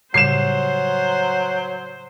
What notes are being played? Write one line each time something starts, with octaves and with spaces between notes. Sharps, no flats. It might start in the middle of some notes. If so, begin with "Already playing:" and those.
A2 C#3 F#3 G3 C5 C7 E7